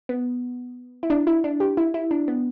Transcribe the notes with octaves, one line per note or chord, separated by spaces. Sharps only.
B3
E4
D4
E4
D4
G4
E4
E4
D4
B3